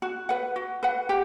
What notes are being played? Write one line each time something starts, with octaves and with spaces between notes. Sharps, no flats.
F#4
B4 F#5
F#4
B4 F#5
G4